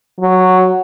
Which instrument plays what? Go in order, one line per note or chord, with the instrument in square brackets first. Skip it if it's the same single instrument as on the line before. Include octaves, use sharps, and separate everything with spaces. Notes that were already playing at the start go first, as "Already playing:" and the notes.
[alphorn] F#3